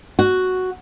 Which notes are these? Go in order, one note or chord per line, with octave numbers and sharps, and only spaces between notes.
F#4